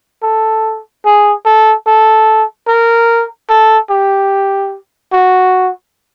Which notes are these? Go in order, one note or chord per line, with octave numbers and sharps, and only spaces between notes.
A4
G#4
A4
A4
A#4
A4
G4
F#4